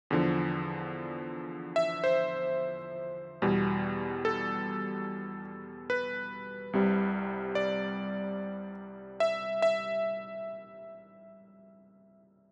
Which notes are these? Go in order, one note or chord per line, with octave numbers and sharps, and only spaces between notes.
E2 D3 F3
E5
C5
E2 B2 G3
A4
B4
C2 C3 G3
D5
E5
E5